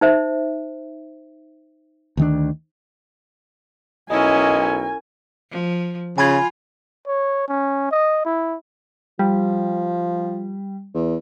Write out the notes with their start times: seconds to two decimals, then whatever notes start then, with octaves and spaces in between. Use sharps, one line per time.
0.01 D#4 C5 E5
2.17 D2 D#3 D4
4.10 B1 C#4 E4 A#4 D#5 G#5
5.51 F3
6.18 C#3 F4 G#5 B5 G#6
7.07 C#5
7.48 C#4
7.91 D#5
8.25 E4
9.19 F3 G3
10.94 E2